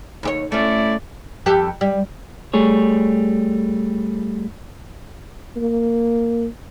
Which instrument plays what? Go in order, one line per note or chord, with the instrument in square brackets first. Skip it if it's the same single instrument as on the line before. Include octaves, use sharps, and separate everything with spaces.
[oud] D#2 G4 C#5
[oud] A3 C#4 [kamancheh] E4 D5
[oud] F2 G4 A4
G3
[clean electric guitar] G3 A3 G#4 C#5
[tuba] A#3